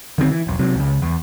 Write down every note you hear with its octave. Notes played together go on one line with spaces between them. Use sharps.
D3 D#3 G3 C4
E3
E1 B1
C3 F#3
C#2 C#3
E2